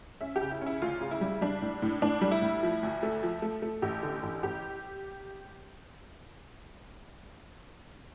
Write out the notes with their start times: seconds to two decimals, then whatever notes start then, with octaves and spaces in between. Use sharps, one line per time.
0.21 C#4 E5
0.36 G4
0.41 C#3
0.51 E4
0.62 C#4 E4
0.82 D2 F4
1.01 C#3
1.11 E4
1.21 G3
1.41 G3 D4
1.62 A2
1.82 A2
2.02 A2 D4
2.21 G3
2.31 E4
2.42 A2
2.63 F3
2.83 D2
3.03 A3
3.23 F3
3.42 A3
3.62 A3
3.82 A1 G4
4.03 D3
4.23 A1
4.43 A1 G4